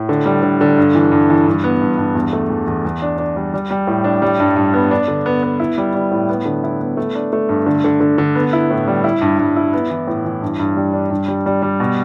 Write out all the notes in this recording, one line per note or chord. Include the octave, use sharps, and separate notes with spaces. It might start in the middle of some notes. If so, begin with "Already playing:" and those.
Already playing: A2
D3
G3
D3
D3
G2
E3
G2
E3
G2
B3
G2
G2
E2
A3
E2
E2
E2
D4
D4
G3
G3
G3
A2
D4
G3
G2
G2
B3
D4
D3
B3
B3
E4
G3
G3
A2
B3
D3
E4
B3
A3
D4
A3
G2
D3
D3
D3
D3
B3
E4
A2
G3
E4
G2
G2
E4
B3
E3
A2
E3
G2
G2
G3
D4
G2
G3
G3
G3
B2